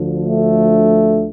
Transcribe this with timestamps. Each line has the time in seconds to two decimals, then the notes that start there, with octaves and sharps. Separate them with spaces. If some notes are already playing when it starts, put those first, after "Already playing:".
Already playing: D2 D3 F3
0.24 A3